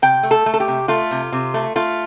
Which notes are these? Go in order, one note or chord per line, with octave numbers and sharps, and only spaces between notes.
C3 G5
A3
A4
A3
A4
G4
C3
A3 F4
C3
C3
A3
A3 F4